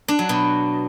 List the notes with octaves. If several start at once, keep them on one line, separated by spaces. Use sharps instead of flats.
D4
F#3
B2